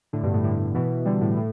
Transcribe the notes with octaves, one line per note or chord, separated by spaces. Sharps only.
A2 D3
G2 B2
A2
A2 D3
B2 E3
D3 G3
A2
A2